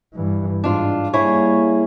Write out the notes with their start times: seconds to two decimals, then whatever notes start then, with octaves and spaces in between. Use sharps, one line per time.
0.14 G2 E3
0.64 G#2 D4 F4
1.13 G3 A#3 E4 G#4 C#5